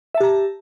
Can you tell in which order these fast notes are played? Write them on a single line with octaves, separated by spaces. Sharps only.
E5 A5 G4 A#5